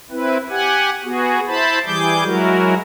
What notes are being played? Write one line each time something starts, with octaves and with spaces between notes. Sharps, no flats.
C4 E4 B4
G4 F#5 G#5
B3 F#4 G#4
E4 C5 A5 B5
E3 G3 G#4 D6 G6
F#3 G#3 E4 F#4 A#4